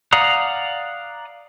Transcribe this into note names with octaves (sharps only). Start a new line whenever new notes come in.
D5 F5 F#5 A#5 D#6